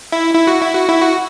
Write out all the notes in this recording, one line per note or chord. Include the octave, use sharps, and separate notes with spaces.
E4
E4
F#4
E4
F#4
E4
F#4